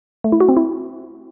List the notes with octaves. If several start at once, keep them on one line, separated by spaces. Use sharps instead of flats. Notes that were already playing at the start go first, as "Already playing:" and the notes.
A3
E4
F#4
C4
E4